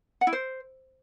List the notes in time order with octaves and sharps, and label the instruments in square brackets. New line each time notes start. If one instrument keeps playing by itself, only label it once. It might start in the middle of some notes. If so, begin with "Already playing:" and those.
[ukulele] F#5
E4
C5